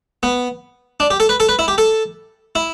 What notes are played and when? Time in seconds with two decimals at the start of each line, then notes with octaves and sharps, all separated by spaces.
0.23 B3
1.00 D4
1.10 G4
1.20 A4
1.29 B4
1.40 A4
1.49 B4
1.59 E4
1.68 G4
1.78 A4
2.55 E4